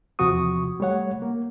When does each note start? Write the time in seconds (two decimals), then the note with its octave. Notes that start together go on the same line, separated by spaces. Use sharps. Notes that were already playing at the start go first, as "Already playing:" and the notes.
0.19 E2 C3 F3 F#4 C#6 D#6
0.80 G3 A3 C#5 F#5
1.22 A#3